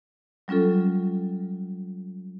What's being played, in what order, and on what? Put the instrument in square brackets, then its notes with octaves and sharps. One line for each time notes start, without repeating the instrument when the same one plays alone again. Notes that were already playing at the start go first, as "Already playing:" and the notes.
[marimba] F#3 G3 C#4 F4 A4